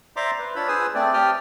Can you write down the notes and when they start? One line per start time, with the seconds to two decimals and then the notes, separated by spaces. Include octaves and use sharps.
0.16 C5 D5 E5 A#5 C6 D6
0.39 B4
0.56 D4 F4 C#5 B5 E6
0.68 G#4 B4 C5 G#5 D#6 E6
0.95 A3 C4 D5
1.14 G4 G5 A5 D#6 F6